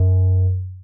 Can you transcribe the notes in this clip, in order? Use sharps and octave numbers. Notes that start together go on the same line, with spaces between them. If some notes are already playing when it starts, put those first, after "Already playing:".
Already playing: F#2